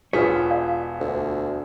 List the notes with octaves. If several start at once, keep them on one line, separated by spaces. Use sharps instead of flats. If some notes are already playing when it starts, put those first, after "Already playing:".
E1 B3 F4 G#4 C#5 B6
D5 F5
D2